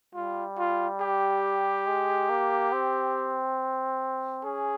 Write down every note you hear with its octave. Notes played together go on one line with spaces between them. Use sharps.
G3 F4
F4
G4
G#3
A#3
C4
C#4 G#4